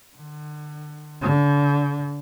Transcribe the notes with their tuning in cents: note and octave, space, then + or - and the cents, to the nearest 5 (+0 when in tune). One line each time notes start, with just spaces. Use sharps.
D3 +35
D3 -35